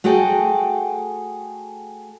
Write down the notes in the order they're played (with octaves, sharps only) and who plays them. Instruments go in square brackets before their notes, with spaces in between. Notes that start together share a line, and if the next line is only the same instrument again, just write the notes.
[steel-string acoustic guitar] A3 F#4 G#4 A4 G5